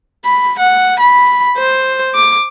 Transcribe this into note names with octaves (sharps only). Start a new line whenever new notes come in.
B5
F#5
B5
C5
D6